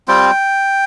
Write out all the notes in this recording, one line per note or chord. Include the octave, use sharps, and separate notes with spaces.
G3 C4 F4 G5